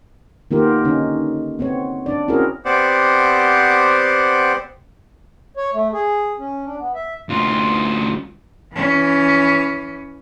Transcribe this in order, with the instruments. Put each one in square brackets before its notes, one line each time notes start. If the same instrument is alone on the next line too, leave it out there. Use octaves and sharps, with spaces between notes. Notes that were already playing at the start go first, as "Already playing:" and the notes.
[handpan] D#3 A#3 B3 F4 G4 A#4
D3 C#4 D#4
B3 C4 C#5
D4 D5
C4 C#4 E4 F#4 G#4 A#4
[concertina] B3 C4 G4 C5 D5 F#5
[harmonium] C#5
A3
G#4
C#4
D4
B3
E5
[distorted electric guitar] D2 F4
[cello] E3 C#4